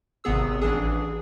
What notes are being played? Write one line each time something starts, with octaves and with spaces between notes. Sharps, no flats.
G#1 C3 B3 G#4 E6
A1 E3 D4 G#4